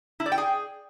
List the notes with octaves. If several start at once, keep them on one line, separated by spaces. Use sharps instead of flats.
E4
D5
G5
G#4